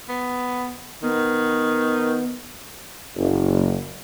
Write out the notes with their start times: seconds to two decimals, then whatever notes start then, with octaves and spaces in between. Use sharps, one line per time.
0.09 B3
1.03 D#3 B3
3.16 F#1